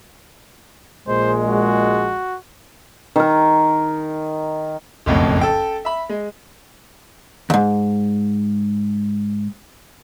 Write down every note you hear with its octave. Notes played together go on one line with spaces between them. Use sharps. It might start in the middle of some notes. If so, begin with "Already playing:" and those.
A#1 A#2 G#3 C5
F#4
D#3 A#4
F#1 B1 F2 A2
A4 G5
E5 B5
G#3
D#2 G#2